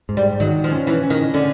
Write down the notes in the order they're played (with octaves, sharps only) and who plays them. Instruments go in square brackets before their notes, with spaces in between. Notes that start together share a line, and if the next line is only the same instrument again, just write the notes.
[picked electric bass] G#2
[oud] G3
[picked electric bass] D#3 [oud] F#3
[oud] F3
[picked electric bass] C#4
[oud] E3
[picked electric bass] C#4
[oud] D#3
[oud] D3 [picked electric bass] C#4